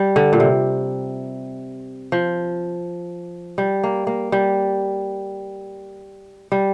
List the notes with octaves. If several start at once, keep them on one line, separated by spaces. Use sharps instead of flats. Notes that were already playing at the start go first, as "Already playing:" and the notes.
Already playing: G3
D3
A#2
C3
F3
G3
A#3
A#3
G3
G3